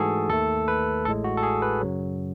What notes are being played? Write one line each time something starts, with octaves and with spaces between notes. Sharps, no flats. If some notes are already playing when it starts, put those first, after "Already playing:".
Already playing: G#2 E3 A3 F#4 G#4 A4
D#2 D#3 A3 A4
B4
A1 A2 G#3 A4
F#4
A4
G#4
B4
F#2 C#3 F#3